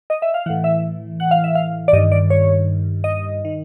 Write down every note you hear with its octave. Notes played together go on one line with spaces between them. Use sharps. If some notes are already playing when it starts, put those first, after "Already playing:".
D#5
E5
F5
A2 E3 F#5
E5
F#5
F5
E5
F5
D5
G2 D#3 D#5
D5
C#5
D#5
D#3